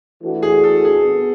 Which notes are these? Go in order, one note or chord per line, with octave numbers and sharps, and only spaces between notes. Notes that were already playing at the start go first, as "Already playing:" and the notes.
E3 A3 D4 F#4
G#4
A4
G#4
B3